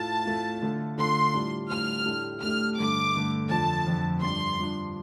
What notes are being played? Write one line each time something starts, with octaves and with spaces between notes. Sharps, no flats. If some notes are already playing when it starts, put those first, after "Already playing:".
Already playing: A2 A3 F4 A5
A2 A3 F4
D3 A3 F4
D3 A3 F4 C6
A2 G3 D4 F4
A2 G3 D4 F4 F6
A2 A3 D4 G4
A2 A3 D4 G4 F6
G2 D3 A3 D6
G2 D3 A3
F2 D3 F3 A5
F2 D3 F3
G2 F3 D4 C6
G2 F3 D4